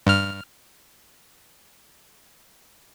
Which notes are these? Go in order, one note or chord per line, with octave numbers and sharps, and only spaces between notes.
G2 F6